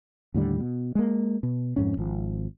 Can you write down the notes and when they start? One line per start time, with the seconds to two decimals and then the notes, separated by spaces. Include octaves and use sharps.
0.34 D#2 A2 D3 G3
0.60 B2
0.95 G#3 A#3
1.43 B2
1.76 F2 G#2 C#4
1.97 G#1 F3